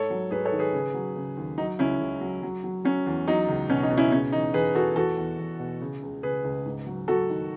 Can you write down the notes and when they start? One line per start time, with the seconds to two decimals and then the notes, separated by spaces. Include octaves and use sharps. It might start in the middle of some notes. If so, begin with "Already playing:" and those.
Already playing: G#2 A4 C#5
0.10 F#3
0.31 G#2 G#4 B4
0.45 A4 C#5
0.52 D#3
0.59 G#4 B4
0.73 C#3
0.94 F#3
1.16 C#3
1.37 D#2
1.58 F#3 D#4
1.79 C#2 C#4 E4
2.00 C#2
2.21 F#3
2.43 F#3
2.64 F#3
2.85 F#3 C#4
3.06 E2
3.28 F#3 D#4
3.48 C#2
3.70 B2 C#4
3.83 D#4
3.90 B2
3.97 C#4 E4
4.12 C#3 C#4
4.32 E3 D#4
4.54 E2 G#4 B4
4.75 E3 F#4 A4
4.96 E2 F#4 A4
5.18 E2
5.39 E2
5.59 B2
5.81 C#3
6.02 C#2
6.23 C#3 G#4 B4
6.44 C#2
6.66 G#2
6.86 F#3
7.08 F#3 F#4 A4
7.30 D#3